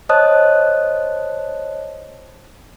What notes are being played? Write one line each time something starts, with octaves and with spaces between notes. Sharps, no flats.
C5 C#5 D#5 A5 D#6 F#6